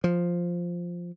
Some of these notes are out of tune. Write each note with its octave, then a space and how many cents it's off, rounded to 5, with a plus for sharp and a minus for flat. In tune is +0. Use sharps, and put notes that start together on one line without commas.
F3 +0